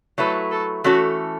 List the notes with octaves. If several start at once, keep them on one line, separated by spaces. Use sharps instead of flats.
F#3 A3 E4 A4 B4
A4
E3 A3 C#4 F#4 A4